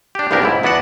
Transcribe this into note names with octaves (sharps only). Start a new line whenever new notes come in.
D4 G4
C2 G2 B3 D4 G4 A#4
C#2 G#2 E4
E2 B3 F#4 D5 F#5 A5